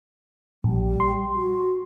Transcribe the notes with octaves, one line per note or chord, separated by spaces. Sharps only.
A#1 G3
C6
F#4